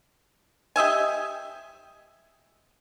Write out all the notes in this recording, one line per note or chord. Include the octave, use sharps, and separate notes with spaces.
G4 D#5 E5 G#5